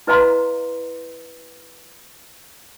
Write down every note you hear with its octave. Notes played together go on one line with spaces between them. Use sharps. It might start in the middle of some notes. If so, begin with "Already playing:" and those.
E4 B4 D#5 F5 A#5 C6